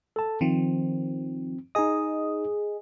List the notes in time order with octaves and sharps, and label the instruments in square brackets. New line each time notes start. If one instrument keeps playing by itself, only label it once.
[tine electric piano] A4 A5
[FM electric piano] D#3 F3 [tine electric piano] C4
[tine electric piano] D#4 D#6 [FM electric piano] G#4 D#5